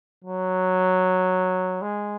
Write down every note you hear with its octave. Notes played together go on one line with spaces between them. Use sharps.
F#3
G#3